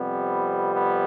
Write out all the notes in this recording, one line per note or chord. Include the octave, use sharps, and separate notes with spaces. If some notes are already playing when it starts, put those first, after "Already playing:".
Already playing: F2 C3 G3 B3
B3